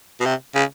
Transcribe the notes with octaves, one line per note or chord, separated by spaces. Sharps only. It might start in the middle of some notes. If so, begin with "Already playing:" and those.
B2
C3
C#3